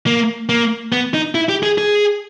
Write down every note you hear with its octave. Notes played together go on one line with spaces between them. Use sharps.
A#3
A#3
B3
D#4
E4
G4
G#4
G#4